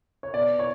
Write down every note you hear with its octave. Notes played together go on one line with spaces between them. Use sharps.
C#5
B2 D5
C#5